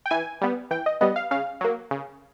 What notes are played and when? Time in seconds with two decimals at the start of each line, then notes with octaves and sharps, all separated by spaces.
0.06 G5
0.11 E3 G#5
0.41 G3 B3
0.71 E3 G5
0.86 D#5
1.01 G3 B3 D#5
1.16 F5
1.31 C#3 F5
1.61 F#3 A#3
1.91 C#3